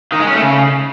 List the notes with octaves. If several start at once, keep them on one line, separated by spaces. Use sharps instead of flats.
D#3
G#3
C#4
A3
C#3